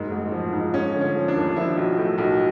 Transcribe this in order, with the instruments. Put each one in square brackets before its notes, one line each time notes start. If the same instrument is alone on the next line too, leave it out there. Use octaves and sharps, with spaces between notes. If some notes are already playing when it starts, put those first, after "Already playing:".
Already playing: [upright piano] F#1 G#2
A1
F3
G#2
F3 C#4
D3
C#4
F3
D4
D#2
F3 E4
B1
A2
B1